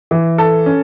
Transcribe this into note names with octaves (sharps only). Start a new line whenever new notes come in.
E3
A4
C#4